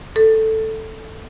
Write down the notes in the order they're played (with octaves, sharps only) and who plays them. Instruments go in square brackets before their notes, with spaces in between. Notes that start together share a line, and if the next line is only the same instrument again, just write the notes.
[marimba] A4